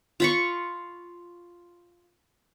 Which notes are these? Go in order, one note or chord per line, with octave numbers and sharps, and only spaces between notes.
F4 B5 C#6